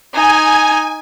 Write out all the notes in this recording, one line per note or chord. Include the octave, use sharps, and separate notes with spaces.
D#4 G#5